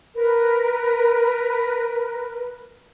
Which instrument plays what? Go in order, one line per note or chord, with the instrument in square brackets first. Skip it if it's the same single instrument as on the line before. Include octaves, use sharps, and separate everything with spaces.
[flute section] A#4 B4